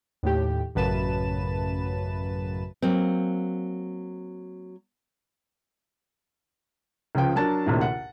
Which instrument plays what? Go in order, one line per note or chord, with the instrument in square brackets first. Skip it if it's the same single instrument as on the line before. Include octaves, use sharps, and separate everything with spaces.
[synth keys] D#2 A2 G4
A1 F#2 C#3 B4 A5 E7
[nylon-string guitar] F#3 A#3 C4
[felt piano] C#2 C#3 F3 G5
F#3 D4 A#4 A5 A6
A#1 D#2 A2 C3
F#5